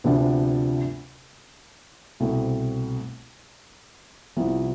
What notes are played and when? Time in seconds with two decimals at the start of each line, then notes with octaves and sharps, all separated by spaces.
0.04 D2 C3 F3 B3 D4
2.20 C2 B2 A3 C4
4.36 C2 C3 F3 B3 E4